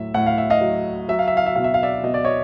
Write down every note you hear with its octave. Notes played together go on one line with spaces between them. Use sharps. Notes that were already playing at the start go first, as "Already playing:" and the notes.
Already playing: A2 F#3 E5
A2 F#5
F5
E5
D#5 F5
F#3
F#3 E5
F5
E5
F5
E5
B2 F5
E5
F5
D5 E5
B2 D#5
D5
C#5 D#5